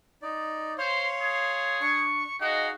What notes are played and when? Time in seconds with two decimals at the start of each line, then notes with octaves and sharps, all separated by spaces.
0.22 D#4 D5
0.78 C5 C#5 F5 C6
1.21 G#4
1.81 D4 C#6
2.41 D#4 F#4 G#4 D#5 F5